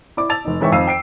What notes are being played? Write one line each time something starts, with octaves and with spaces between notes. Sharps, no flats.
E4 D5 D6
A5 E6 A6 F7
F1 D#4
G#2 E3 C#5 E5 G5 C#6
F2 D#3 F5 E6 C7 D#7
G5 C7 D7